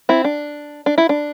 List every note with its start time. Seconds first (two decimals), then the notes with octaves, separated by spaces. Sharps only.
0.09 C4 E4
0.24 D4
0.86 D4
0.98 E4
1.09 D4